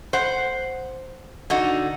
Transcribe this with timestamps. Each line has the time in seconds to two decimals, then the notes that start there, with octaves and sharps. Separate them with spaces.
0.13 C5 F#5
1.50 D3 D#4 F#4